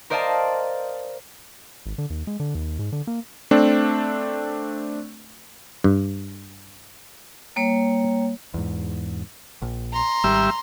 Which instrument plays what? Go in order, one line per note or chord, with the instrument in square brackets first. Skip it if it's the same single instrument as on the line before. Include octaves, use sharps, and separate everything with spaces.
[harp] A#4 C5 D5 D#5 F5 A5
[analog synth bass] G#1
D3
D#2
G#3
D3
D#2
G#2
D3
A#3
[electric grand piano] A3 C4 D4
[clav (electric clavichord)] G2
[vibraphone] G3 A#3 C#5
[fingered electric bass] E2 G#2
A#1
[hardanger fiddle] A#5 C6
[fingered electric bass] G#1 [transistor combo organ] G3 E5